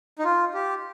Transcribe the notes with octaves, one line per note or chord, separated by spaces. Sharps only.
D#4
F4
G4